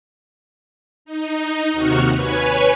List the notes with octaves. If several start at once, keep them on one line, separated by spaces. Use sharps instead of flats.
D#4
D#2 C3 F#4 C#6 F6 F#6
B4 C#5 G#5